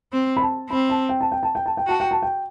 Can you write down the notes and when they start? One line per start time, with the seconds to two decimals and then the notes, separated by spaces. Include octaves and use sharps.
0.13 C4
0.37 B5
0.42 A5
0.70 C4 B5
0.89 A5
1.09 G5
1.21 A5
1.32 G5
1.43 A5
1.55 G5
1.66 A5
1.77 G5
1.86 F#4 A5
2.00 G5
2.11 A5
2.22 G5